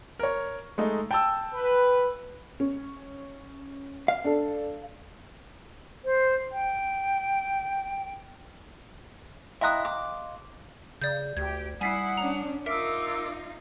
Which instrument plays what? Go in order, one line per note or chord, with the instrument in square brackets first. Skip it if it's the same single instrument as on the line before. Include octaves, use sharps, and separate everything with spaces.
[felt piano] A#4 C#5
G#3 A3 D#4
G5 A5 E6
[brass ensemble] B4
[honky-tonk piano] C#4
[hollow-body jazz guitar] F5
[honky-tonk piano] D4 A4
[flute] C5
G5
[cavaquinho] E4 A#5 D#6 [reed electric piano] D#5 F5 C6 [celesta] G5 F#6
[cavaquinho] D6
[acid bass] C#3 [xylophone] D5 G6
[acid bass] D2 [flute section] G4 [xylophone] G#6
[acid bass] G3 [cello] E4 [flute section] F#5 D#6 [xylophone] G#5 B6 C7
[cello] C#4 D4 [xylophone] A#5
[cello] D#4 F4 [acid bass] A#4 [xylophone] E5 [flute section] D6 E6